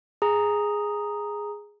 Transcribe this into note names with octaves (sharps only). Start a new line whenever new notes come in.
G#4 A#5